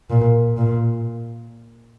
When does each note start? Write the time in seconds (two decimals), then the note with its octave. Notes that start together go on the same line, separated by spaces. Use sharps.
0.10 A#2
0.57 A#2